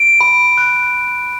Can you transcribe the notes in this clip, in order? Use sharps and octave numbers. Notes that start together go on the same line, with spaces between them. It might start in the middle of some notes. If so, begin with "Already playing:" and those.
Already playing: D7
B5
F#6